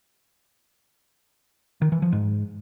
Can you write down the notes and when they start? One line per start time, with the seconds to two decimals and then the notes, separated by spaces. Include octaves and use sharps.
1.82 D#3
1.92 E3
2.02 F3
2.12 G#2